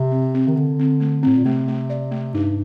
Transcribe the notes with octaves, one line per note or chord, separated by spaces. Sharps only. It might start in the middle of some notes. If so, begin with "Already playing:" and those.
Already playing: C3 G4
C4
C4
D#3
D3 C4
C4
A3
A2 C4
A#2
C3 A3
A3
D5
A3
G2 D#4